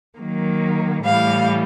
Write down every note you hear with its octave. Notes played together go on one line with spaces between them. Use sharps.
D#3 F#3 A#3
A2 E3 G3 F5